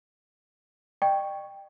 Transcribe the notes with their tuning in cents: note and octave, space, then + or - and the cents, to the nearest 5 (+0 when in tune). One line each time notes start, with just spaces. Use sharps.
D5 +45 G5 +0 C#6 +0